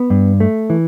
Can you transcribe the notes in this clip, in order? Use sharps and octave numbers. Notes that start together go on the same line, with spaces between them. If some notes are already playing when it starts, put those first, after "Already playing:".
Already playing: B3
G2
A3
E3